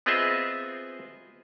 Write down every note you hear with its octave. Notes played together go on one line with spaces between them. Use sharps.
B3 C4 F4 G#4 D#5 E5